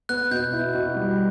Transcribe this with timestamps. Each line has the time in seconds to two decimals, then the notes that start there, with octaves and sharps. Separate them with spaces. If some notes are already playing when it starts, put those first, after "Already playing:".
0.09 B3 F#6
0.31 B2 G6
0.53 E4
0.75 B2
0.96 G3